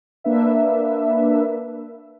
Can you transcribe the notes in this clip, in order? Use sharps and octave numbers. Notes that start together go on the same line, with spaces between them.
A#3 D4 B4 E5